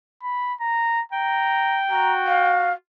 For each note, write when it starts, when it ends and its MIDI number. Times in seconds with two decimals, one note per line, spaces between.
0.23 0.54 83
0.61 1.02 82
1.12 2.58 79
1.12 1.81 82
1.91 2.75 66
1.91 2.12 82
2.27 2.73 77